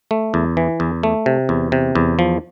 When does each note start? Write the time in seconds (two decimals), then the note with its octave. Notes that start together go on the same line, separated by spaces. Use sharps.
0.11 A3
0.34 E2
0.57 E3
0.80 E2
1.03 A3
1.26 C3
1.49 E2
1.72 C3
1.95 E2
2.19 F3